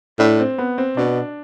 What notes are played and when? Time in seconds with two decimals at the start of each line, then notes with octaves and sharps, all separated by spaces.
0.19 A2 D4
0.40 C4
0.58 B3
0.78 C4
0.97 B2 D4